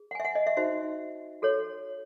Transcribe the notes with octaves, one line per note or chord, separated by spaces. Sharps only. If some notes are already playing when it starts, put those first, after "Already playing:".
Already playing: G#4
F#5
G#5
E5
F#5
D#5
E5
D#4 F#4 C5 E5
F#4 A4 C#5